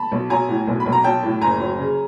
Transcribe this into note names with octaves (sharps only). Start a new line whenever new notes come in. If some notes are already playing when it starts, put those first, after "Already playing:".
Already playing: A5 B5
B1
F#3 G#5 A#5
A2
B1
B5
B1
A#5
F#3 G5 A5
A2
F#1 G#5 A#5
F#3
C#3